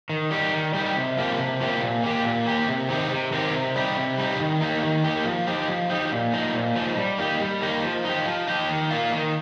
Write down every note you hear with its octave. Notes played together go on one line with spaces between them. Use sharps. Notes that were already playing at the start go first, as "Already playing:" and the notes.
D#3
G3 D#4 G4
D#3
G3 D#4 G4
C3
F3 A#3 G4
C3
F3 A#3 G4
A#2
A#3 G4
A#2
A#3 G4
C3
D#3 C4 D#4 G4
C3
D#3 C4 D#4 G4
C3
G3 D#4 G4
C3
G3 D#4 G4
D#3
A#3 D#4 G4
D#3
A#3 D#4 G4
F3
D#4 G4
F3
D#4 G4
A#2
F3 D#4
A#2
F3 D#4
G3
A#3 D#4 G4
G3
A#3 D#4 G4
F3
D#4 G4
F3
D#4 G4
D#3
A#3 F4
D#3